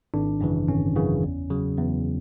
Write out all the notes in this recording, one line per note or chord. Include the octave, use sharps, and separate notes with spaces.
G#1 D4
F#2 C#3 E3
G#1 C#4
F#2 C#3 E3
E2
C#3 F#3
E2